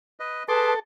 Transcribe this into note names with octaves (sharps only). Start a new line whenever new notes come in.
B4 D#5
G#4 A4 B4 A5 C6 D6